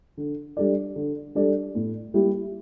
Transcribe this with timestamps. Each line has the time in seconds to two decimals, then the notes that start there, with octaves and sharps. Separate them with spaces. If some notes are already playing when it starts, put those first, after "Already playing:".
0.17 D3
0.57 G3 D4 A4 D5
0.96 D3
1.35 G3 D4 A4 D5
1.75 A2
2.14 G3 A#3 E4 G4